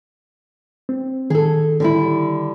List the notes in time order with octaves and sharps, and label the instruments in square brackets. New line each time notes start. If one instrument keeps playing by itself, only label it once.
[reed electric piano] C4
[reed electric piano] D#3 [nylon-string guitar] G#4 A4
[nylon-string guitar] D3 G3 E4